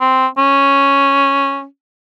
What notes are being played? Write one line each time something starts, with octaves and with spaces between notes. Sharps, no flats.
C4
C#4